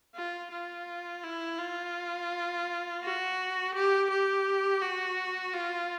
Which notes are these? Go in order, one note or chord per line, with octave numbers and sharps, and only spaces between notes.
F4
F4
E4
F4
F#4
G4
G4
F#4
F4